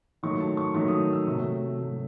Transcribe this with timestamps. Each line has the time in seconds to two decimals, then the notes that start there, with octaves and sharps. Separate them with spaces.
0.23 D#3 F#3 A3 C#6
0.40 A5
0.57 C#6
0.74 D#3 F#3 A3 C#6
0.88 D#6
1.13 E6
1.27 C3 F#3 A3
1.78 C3 F#3 A3